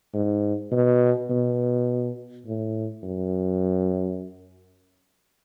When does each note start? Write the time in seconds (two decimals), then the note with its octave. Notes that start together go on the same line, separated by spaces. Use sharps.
0.14 G#2
0.72 B2
1.30 B2
2.46 A2
3.03 F#2